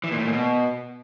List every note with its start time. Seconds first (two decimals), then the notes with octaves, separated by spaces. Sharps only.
0.04 E3
0.11 A#2
0.18 A2
0.25 A#2
0.33 B2